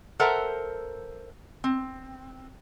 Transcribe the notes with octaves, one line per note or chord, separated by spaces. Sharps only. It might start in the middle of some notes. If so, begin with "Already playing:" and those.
A4 A#4 C5 E5 F#5 A#5
C4